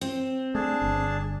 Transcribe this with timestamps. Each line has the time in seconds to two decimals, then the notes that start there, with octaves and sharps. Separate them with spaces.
0.01 C4
0.55 A3 D4 G#4 A5
0.82 G1